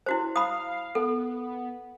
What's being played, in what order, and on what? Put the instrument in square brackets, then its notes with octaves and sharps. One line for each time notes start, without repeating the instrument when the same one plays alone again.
[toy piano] E4 F#4 C5
[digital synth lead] F5 [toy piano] B5 D#6
[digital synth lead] B3 [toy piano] A4